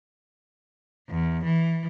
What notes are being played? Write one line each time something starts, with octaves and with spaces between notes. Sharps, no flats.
E2
E3